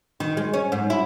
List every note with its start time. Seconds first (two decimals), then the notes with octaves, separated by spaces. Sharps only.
0.20 D#3
0.37 G#3
0.53 C#4
0.72 G#2
0.90 E4